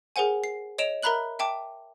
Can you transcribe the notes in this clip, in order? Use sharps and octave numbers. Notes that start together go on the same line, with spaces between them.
G#4 A#4 C5 F#5 G#5
C7
C#5 D#5 D7 E7 F7
A#4 E5 A#5 B5 F#6 F#7
E5 G5 A5 D6